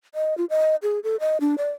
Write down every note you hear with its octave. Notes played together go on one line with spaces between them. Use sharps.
D#5
F4
D#5
G#4
A4
D#5
D4
D5